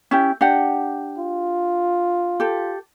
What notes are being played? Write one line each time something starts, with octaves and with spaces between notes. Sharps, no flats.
C#4 E4 G4
D4 G4 F#5
F4
G4 A4